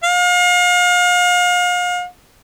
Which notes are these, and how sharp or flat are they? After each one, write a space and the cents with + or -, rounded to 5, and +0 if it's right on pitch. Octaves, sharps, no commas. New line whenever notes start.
F5 +40